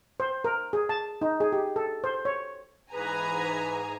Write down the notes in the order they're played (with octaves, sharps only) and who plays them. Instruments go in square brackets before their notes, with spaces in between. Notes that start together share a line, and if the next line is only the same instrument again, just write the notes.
[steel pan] C5
A#4
G#4
A5
D#4
G#4
G4
A4
C5
C#5
[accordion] G#2 E3 G#4 [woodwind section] B4 [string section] G#5 A#5